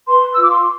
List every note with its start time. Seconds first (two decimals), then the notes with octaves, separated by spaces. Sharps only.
0.07 B4 C6
0.32 F4 E6
0.42 D6
0.50 C6